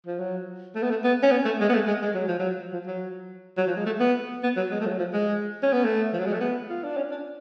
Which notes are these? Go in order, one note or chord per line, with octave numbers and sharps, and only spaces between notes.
F3
F#3
A3
B3
A3
B3
C#4
B3
A3
G#3
B3
A3
G#3
G#3
F#3
F3
F#3
F3
F#3
F#3
F3
G#3
A3
B3
B3
F#3
G#3
A3
F3
F#3
F3
G#3
C#4
B3
A3
F3
F#3
G#3
A3
B3
F4
D4
C#4
D4